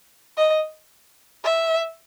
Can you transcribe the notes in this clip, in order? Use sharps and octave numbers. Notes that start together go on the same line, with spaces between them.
D#5
E5